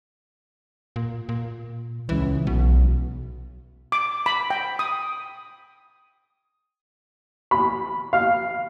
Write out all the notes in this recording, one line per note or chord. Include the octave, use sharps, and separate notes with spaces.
A#2
A#2
C#2 E3
B1 B2
D6
B5
G5
D#6
B5
F5